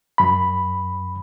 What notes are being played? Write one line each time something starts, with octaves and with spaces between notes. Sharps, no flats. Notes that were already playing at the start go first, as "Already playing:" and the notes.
F#2 B5